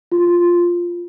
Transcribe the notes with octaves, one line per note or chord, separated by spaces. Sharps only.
F4